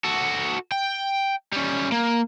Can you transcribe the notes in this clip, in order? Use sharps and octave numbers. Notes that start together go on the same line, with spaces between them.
F#4 A4
G5
G3 C#4
A#3